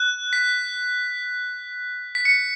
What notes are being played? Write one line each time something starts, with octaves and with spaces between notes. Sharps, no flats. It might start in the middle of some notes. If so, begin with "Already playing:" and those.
Already playing: F#6
B6
B6
C#7